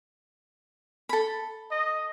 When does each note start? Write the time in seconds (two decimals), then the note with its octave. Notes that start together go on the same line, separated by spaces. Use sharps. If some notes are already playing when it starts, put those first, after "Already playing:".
1.09 A4 B5
1.71 D#5